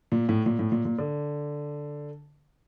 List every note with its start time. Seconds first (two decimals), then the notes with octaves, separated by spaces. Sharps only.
0.12 A#2
0.29 A2
0.46 A#2
0.59 A2
0.72 A#2
0.85 A#2
0.98 D3